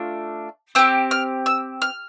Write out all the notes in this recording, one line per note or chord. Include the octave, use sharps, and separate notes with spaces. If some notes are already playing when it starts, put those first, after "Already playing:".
Already playing: A3 D4 F4
C4 G4 E6
F6
E6
F6